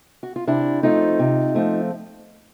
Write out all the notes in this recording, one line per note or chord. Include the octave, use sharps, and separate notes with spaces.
F#4
F4
C3 D4 E4
F3 A3 C4 D#4 F4
C3
F3 A3 C4